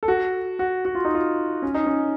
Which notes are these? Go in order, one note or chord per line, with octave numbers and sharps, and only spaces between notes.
A4
F#4
F#4
F#4
F4
D#4
F4
C#4
D#4
C#4